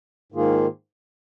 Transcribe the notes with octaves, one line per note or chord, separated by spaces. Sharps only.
G#2 D#3 A#3 F4 G#4